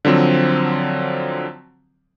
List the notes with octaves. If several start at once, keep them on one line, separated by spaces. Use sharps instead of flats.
D3 F3 F#3 C4